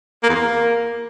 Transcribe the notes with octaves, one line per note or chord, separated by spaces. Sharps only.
A#3
E2
A#3